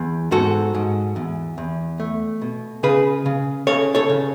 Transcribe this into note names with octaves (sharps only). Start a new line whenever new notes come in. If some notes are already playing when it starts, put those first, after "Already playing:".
Already playing: E2
G#2 F#4 A4
G#2
E2
E2
A3
B2
C#3 G#4 B4
C#3
C#3 A4 C#5
A4 C#5
C#3